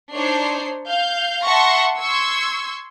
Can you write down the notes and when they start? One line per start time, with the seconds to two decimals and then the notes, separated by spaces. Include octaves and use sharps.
0.14 D4 D#4 C5 C#5 C7
0.87 F5 G6
1.46 E5 F#5 A5 C6 C#6 A#6
1.99 C6 C#6 E6 G#6